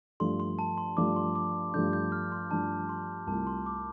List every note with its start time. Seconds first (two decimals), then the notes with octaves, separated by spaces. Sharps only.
0.20 G2 F3 A3 D4 C6
0.40 C6
0.59 A5
0.78 C6
0.97 G2 F3 A3 D4 D6
1.16 C6
1.35 D6
1.74 G2 F3 A3 D4 G6
1.93 G6
2.12 F6
2.32 C6
2.51 G2 F3 A3 D4 A5
2.89 C6
3.27 C2 C3 A3 F4 A5
3.47 C6
3.66 D6